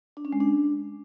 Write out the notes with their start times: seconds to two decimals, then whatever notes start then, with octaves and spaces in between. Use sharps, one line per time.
0.17 D4
0.25 C#4
0.32 G#3
0.40 D4